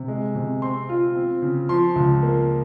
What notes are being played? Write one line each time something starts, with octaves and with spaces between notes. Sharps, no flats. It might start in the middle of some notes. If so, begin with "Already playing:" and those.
Already playing: C3
G#3
C3
C4 C6
F4
C4
C#3
F3 C6
C#2
A#3